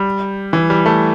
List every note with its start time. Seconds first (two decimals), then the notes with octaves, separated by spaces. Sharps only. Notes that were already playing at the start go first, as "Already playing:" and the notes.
Already playing: G3
0.53 E3
0.70 G3
0.86 A3